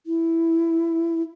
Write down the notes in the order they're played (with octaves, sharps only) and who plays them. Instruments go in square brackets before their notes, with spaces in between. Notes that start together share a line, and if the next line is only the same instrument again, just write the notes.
[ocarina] E4